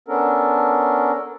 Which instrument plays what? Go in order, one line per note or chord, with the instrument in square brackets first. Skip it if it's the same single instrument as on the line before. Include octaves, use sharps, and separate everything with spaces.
[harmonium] B3 C#4 D4 A4 A#4